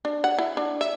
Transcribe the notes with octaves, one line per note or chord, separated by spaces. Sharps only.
D4
F#5
E4
D4
E5